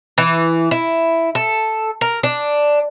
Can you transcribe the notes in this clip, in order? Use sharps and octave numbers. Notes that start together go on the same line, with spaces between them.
E3
E4
A4
A#4
D4